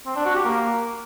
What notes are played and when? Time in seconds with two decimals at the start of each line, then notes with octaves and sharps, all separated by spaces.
0.06 C4
0.16 D4
0.25 F#4
0.35 G4
0.45 A#3